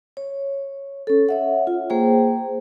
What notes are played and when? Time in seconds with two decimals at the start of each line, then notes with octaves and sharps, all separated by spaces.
0.17 C#5
1.07 C#4 A4
1.29 C#5 E5 F#5
1.67 F4
1.90 A#3 G#4 C5 G5